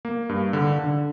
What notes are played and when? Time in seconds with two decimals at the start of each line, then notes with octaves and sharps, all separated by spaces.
0.05 A#3
0.29 G2
0.53 D3
0.79 D3